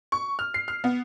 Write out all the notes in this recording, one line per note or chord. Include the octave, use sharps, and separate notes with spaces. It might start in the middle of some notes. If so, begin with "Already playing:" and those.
C#6
F6
C7
F6
B3